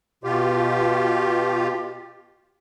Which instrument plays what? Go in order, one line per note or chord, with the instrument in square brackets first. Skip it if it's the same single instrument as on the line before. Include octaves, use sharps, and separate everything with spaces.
[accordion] B2 F4 G4